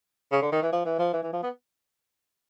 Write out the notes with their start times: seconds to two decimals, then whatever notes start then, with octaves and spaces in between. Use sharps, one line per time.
0.32 C#3
0.42 D3
0.52 D#3
0.63 E3
0.73 F3
0.86 E3
0.99 F3
1.13 E3
1.23 E3
1.33 F3
1.43 B3